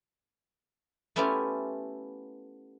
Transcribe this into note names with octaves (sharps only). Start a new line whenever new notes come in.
A3 B3 C#4 E4 F4 G4